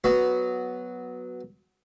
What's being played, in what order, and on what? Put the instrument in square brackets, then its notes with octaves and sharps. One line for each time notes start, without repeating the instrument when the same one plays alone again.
[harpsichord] F#3 B3 F#4